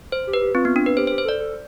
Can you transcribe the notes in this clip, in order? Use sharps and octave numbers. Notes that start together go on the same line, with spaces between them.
C5
G4
B4
G4
C4 F4
B3
D4
B4
G4 C5
C5
G4
C5
A4 D5
A4